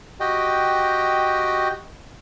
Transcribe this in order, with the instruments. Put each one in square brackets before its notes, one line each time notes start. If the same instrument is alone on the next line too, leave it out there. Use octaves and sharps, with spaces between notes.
[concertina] F#4 G4 D#5 G5